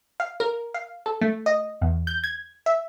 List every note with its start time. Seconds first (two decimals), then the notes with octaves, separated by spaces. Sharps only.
0.20 F5
0.40 A#4
0.74 F5
1.06 A4
1.21 A3
1.46 D#5
1.81 E2
2.07 G6
2.24 G#6
2.66 E5